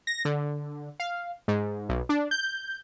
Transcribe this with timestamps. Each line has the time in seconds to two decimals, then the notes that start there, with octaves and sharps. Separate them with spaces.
0.07 A#6
0.25 D3
1.00 F5
1.48 G#2
1.89 B1
2.09 D4
2.31 G6